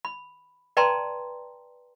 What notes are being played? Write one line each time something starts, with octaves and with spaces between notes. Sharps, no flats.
B5
B4 D5 G5 A5 A#5 C6